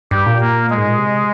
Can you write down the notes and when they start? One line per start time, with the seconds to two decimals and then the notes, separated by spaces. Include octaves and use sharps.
0.11 G2 G4
0.26 A#2
0.40 A#3
0.70 G#3
0.77 G#2
0.88 A#2
0.98 C3